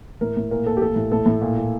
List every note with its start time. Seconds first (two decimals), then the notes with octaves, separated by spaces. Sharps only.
0.21 A2 A#4
0.36 A2
0.51 A#2 A#4
0.66 A#2 A4
0.77 G4
0.81 A2 A4
0.96 A2
1.12 A2 A4
1.26 A2
1.41 A#2
1.57 A#2